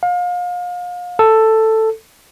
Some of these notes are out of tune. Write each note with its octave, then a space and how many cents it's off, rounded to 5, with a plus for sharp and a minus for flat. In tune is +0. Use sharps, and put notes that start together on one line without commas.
F5 +35
A4 +5